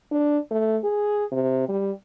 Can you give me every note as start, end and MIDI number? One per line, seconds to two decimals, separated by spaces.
0.11 0.39 62
0.51 0.78 57
0.84 1.26 68
1.32 1.68 48
1.69 1.91 55